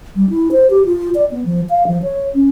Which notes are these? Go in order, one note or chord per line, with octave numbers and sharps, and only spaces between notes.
G3
E4
C5
G4
F4
D5
B3
F3
F5
F3
C#5
C#4